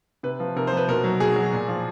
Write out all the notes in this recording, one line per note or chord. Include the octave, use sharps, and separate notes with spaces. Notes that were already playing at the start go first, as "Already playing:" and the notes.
C3 B4
F3
C3 A#4
C5
F3 B4
B2 A#4
F#3
B2 G#4
F#3
A#2
F3